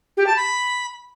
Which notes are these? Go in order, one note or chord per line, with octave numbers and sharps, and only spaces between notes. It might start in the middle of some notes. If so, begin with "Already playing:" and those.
G4
A5
B5